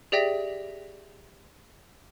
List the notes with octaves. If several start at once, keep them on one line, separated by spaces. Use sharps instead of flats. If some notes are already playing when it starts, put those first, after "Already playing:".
G4 G#4 D5 E5 G5 A#6